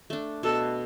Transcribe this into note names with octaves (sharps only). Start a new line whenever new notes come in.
A3 D4
B2 A4